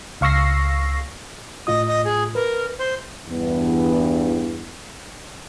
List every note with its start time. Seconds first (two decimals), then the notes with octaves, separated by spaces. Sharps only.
0.21 C#2 F5 C#6 E6 A#6 C7
1.67 A2 F4 D#5 D#6
1.87 D#5
2.05 G#4
2.35 A#4 B4
2.79 C5
3.29 E2 G2 B3